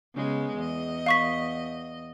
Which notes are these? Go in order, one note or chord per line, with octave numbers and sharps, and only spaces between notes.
C#3 G#3 B3
E2 D#5
F5 C#6 B6